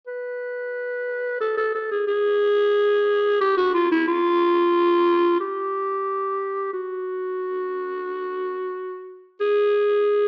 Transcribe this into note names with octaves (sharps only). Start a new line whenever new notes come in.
B4
A4
A4
A4
G#4
G#4
G4
F#4
F4
E4
F4
G4
F#4
G#4